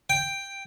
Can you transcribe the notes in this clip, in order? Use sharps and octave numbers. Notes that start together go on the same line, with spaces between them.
G5